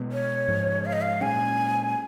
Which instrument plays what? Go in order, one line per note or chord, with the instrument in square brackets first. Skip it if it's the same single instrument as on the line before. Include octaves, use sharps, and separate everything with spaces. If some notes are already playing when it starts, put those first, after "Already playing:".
Already playing: [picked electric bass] B2 G#3 B3
[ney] C#5
[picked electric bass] G#2 F3 G#3
[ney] F5
D#5
F5
[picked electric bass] A#2 G#3 C#4 [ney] G#5